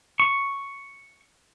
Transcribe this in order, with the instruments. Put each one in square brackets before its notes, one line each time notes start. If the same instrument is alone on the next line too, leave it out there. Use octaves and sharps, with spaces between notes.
[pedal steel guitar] C#6